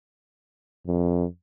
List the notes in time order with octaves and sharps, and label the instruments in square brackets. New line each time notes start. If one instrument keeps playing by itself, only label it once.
[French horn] F2